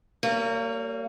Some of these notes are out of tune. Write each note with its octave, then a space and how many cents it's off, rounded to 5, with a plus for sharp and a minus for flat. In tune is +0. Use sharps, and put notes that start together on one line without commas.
G3 -10 A#3 -25 C#5 +30